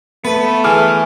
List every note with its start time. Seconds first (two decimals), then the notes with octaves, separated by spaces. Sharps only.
0.25 A3 B3 B4
0.64 E3 G#4 D6 F6